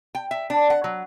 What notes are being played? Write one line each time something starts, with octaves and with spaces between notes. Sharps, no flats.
G5
E5
D4
F#5
F#3